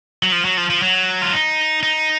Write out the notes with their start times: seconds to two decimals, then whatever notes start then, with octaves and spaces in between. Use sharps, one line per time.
0.23 F#3
0.32 F3
0.45 F#3
0.57 F3
0.70 F3
0.82 F#3
1.22 F4
1.33 D#4
1.83 D#4